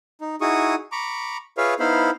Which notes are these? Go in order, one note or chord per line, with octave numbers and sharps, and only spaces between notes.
D#4
D#4 E4 F#4 G#4 C#6 D#6
A#5 B5 C#6 D6
F4 G#4 B4 C#5 E5 F5
B3 D#4 E4 C5 F5 B5